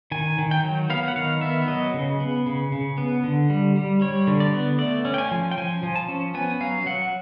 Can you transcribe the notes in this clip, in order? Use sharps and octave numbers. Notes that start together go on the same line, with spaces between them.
D#3 G#5
D#3
G5
F#3
B3 F5
F#5
D#3 F5
B3 E5
F#3 D#5
C#3
B3
C#3
C#3
B3
D3
G3
G3
G3 C#5
D3
D5
B3
A3 D5
C#4
G5
G#5
F3
G5
F3 G#5
F3
A5
C#4
B3 G#5
F#3 F5
F#3 F#5